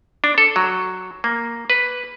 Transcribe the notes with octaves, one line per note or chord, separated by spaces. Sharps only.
D4
A4
F#3
A#3
B4